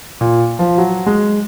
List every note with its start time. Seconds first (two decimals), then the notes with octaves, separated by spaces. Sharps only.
0.21 A#2
0.59 F3
0.78 F#3
1.06 G#3